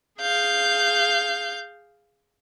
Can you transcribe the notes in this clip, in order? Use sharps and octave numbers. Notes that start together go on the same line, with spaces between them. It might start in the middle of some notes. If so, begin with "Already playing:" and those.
G#4 F5 G6